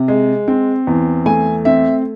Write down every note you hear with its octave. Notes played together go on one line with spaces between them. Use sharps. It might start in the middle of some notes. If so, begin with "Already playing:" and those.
Already playing: C3
G#3
C4
E2
A3 G#5
C4 E5